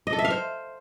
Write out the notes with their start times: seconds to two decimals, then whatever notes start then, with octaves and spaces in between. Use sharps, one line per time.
0.07 D#5
0.13 A4
0.19 E5
0.25 F5
0.30 C5